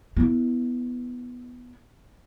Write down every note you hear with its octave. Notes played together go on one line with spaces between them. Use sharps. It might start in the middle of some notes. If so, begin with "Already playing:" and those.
B3 E4